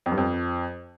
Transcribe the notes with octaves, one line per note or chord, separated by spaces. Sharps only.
F2
G2
F2